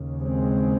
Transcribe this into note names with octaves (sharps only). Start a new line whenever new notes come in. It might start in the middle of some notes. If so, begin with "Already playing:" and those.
Already playing: D#2 C#3
G#3 C4